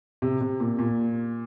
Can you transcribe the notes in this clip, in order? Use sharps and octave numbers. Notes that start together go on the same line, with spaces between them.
C3
C3
A#2
A#2